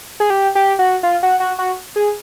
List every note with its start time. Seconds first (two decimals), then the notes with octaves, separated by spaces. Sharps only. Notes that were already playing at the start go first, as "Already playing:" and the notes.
0.20 G#4
0.30 G4
0.55 G4
0.79 F#4
1.03 F4
1.23 F#4
1.40 F#4
1.59 F#4
1.96 G#4